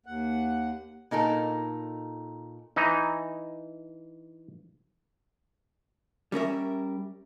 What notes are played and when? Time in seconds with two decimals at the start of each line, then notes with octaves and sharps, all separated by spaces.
0.06 D#2 F#5
1.11 A#2 D#4 A4 A#4
2.76 E3 D#4
6.32 G3 C#4 A#4 E5